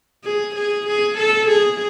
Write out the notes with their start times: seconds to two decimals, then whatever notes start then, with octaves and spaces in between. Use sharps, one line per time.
0.24 G#4
0.55 G#4
0.87 G#4
1.18 A4
1.48 G#4